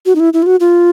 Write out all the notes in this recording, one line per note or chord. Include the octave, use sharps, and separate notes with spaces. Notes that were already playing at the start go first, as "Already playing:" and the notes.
F#4
D#4
E4
E4
F4
F#4
F4